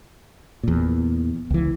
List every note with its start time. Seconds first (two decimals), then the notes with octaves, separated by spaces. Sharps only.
0.63 E2 A#2
1.50 C#2 E3